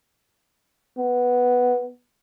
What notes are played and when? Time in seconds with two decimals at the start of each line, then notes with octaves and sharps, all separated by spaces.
0.98 B3